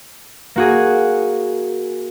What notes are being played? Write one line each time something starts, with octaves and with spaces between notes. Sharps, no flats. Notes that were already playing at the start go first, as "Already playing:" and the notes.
A#3 F#4 G#4